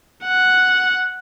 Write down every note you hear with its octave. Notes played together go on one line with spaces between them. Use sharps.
F#5